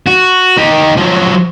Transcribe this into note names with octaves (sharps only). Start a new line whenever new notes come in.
F#4
D#4 G4
F3 F#3